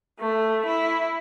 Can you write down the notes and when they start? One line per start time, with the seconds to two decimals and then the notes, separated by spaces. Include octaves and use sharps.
0.18 A3
0.66 E4